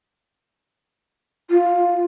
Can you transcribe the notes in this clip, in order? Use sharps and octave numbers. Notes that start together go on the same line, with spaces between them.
F4